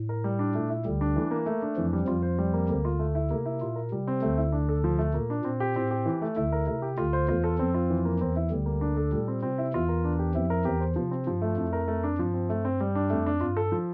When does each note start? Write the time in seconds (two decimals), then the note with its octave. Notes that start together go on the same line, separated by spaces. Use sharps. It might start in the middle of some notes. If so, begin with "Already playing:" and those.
Already playing: A2
0.09 A#4
0.24 G3
0.39 D4
0.55 A#2 A3
0.70 E4
0.85 D2 D3 G3
1.01 D4
1.16 E3
1.31 A#3
1.46 A3
1.62 D4
1.77 F2 E3 F3
1.93 G3
2.07 F2 F3 F4
2.22 C5
2.39 G3
2.54 A#3
2.69 D2 D3 A#3
2.85 F4
2.99 A3
3.15 E4
3.30 C3 A#3
3.45 E4
3.61 A#2 F4
3.76 A#4
3.91 C3 G3
4.07 C4
4.22 D2 D3 A3
4.38 E4
4.52 D4
4.69 A4
4.84 F3
4.99 A3
5.14 A#2 A#3
5.30 D4
5.44 A#2 C4
5.60 G4
5.76 A2 C4
5.91 G4
6.06 E3
6.22 A3
6.36 D2 D3 E4
6.52 A#4
6.67 C3 E4
6.82 G4
6.98 D2 D3 F4
7.13 C5
7.28 E2 E3 F4
7.44 A4
7.59 F2 F3 C4
7.74 F4
7.90 E3
8.05 A#3
8.20 E2 E3 C4
8.36 E4
8.50 D2 D3 G3
8.66 A#3
8.81 D4
8.97 A4
9.12 A#2 G3
9.28 C4
9.42 C3 C4
9.58 E4
9.74 E2 E3 F4
9.89 A#4
10.04 D4
10.19 G4
10.34 F2 F3 E4
10.50 A#4
10.65 E2 E3 G4
10.80 C5
10.96 C3 F3
11.11 C4
11.26 G2 F3
11.42 A3
11.57 F2 E4
11.73 A#4
11.88 A3
12.03 D4
12.18 G2 F3
12.34 C4
12.49 A3
12.65 C4
12.80 G3
12.95 D4
13.10 F2 A3
13.26 D4
13.41 G2 F4
13.57 A4
13.72 F3